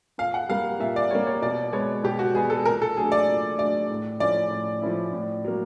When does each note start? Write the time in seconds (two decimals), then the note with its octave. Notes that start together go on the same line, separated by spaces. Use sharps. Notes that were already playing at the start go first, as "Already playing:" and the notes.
0.18 A#2 F5
0.34 F#5
0.49 G3 A#3 F5
0.80 A#2 E5
0.96 D5
1.11 G3 A#3 C#5
1.27 C#5
1.42 B2 D5
1.73 G#3 B3 C#5
2.03 B2 G4
2.19 F#4
2.35 G#3 B3 G#4
2.50 A4
2.66 A#2 A#4
2.82 A4
2.97 F#3 A3 D4 G#4
3.12 D5
3.28 A#2
3.59 F#3 A3 D4 D5
3.90 A2
4.20 F3 A3 C#4 E4 D5
4.51 A2
4.82 F3 A3 C#4 E4
5.13 A2
5.44 F#3 A#3